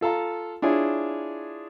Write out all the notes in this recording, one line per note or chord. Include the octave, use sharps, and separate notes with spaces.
F4 A4 F5 A#5
D4 E4 F4 G#4 C#5